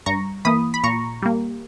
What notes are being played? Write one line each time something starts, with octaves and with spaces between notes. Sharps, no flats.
G2 A#5 C#6
E3 A#3 B5 D#6
B5
A#2 A#5 C#6
G3 A#3